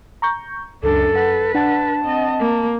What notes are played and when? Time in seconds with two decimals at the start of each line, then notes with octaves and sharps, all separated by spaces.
0.22 A#5 C#6 G6
0.83 C#2 F#2 D4 A4
1.16 B4 F#5
1.55 D4 F#5 A5 A6
2.03 C4 D#5
2.39 A#3